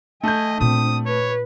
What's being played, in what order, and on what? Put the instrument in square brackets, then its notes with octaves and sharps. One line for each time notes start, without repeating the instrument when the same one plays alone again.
[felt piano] A3 G6 [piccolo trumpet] D#5 [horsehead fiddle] G#5
[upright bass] A#2 F4 [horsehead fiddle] C4 D4 [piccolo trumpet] D#6
[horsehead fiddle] B4 [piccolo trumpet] C#5